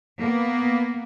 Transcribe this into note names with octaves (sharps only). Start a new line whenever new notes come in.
A#3 B3